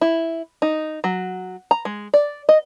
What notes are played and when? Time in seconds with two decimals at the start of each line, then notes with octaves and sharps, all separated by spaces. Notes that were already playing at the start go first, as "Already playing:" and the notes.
0.01 E4
0.62 D#4
1.04 F#3
1.71 A#5
1.85 G#3
2.14 D5
2.49 D#5